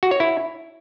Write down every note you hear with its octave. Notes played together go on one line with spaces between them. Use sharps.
F#4
C#5
E4